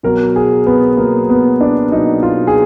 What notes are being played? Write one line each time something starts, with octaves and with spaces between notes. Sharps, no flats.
B2 F#3 A#4
G#4
B3
B2 F#3 A#3
B3
D4
B2 F#3 D#4
F4
G#4